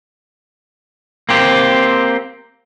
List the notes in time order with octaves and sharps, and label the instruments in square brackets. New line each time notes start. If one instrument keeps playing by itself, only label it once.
[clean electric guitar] A#3 C4 G4